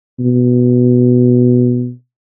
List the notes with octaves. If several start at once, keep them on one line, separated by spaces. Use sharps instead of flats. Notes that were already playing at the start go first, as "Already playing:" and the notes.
B2